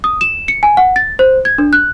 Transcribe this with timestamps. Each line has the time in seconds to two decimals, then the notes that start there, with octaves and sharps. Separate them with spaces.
0.04 D#6
0.21 E7
0.48 C#7
0.63 G#5
0.77 F#5
0.96 A6
1.19 C5
1.45 G#6
1.58 D4
1.73 F#6